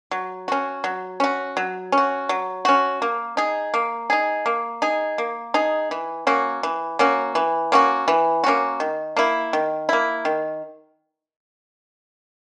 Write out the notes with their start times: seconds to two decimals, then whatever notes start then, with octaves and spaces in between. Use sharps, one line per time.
0.11 F#3
0.48 C#4 F#4
0.84 F#3
1.20 C#4 F#4
1.57 F#3
1.92 C#4
1.97 F#4
2.29 F#3
2.65 C#4 F#4
3.02 A#3
3.37 D#4 G#4
3.74 A#3
4.10 D#4 G#4
4.46 A#3
4.82 D#4 G#4
5.18 A#3
5.54 D#4 G#4
5.91 E3
6.27 A#3 C#4 F#4
6.63 E3
6.99 A#3 C#4 F#4
7.35 E3
7.72 A#3 C#4 F#4
8.08 E3
8.44 A#3 C#4 F#4
8.80 D#3
9.17 A#3 E4
9.53 D#3
9.89 A#3 E4
10.25 D#3